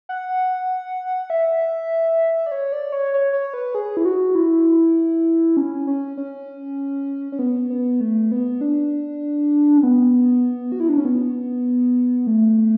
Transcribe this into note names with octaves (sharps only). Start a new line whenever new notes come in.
F#5
E5
D5
C#5
D5
C#5
C#5
C#5
B4
G#4
E4
F#4
E4
C#4
C#4
C#4
C#4
B3
B3
A3
B3
D4
C#4
B3
F#4
E4
D4
C#4
B3
A3